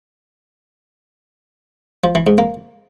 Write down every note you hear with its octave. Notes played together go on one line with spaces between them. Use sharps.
F3
E3
G#2
A#3